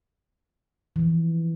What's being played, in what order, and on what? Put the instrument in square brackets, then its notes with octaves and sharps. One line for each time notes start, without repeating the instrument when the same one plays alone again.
[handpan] E3 F3